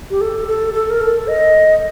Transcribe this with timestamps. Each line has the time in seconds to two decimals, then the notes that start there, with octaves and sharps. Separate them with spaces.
0.10 G4
0.21 A4
0.48 A4
0.74 A4
0.90 A#4
1.01 A4
1.27 D#5